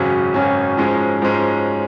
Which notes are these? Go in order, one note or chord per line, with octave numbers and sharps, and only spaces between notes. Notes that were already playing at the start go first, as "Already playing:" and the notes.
Already playing: G#1 F#2 C#3 F#3 C#4
G#1 F#2 C#3 F#3 C#4
G#2 F3 G#3 C#4
G#2 F3 G#3 C#4